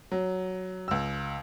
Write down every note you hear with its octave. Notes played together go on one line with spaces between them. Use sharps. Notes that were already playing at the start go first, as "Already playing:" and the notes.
F#3
C#2 E6